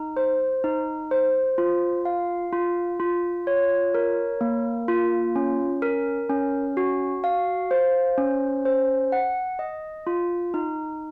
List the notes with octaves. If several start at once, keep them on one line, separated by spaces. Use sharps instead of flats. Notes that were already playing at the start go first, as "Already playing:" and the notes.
Already playing: D#4
C5
D#4
C5
F4
F5
F4
F4
C#5
A#4
A#3
F4
C#4
A#4
C#4
F#4
F5
C5
C#4
C5
F#5
D#5
F4
D#4